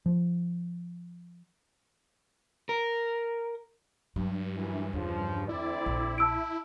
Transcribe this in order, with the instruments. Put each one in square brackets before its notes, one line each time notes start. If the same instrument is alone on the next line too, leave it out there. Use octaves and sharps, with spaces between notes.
[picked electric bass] F3
[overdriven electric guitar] A#4
[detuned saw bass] G2 [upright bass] F#3
[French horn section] F#2 E3
[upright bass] E2 [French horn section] C#3 F3
[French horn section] D2 C4 D5 [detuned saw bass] E4
[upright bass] A#1
[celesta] A5 E6 D7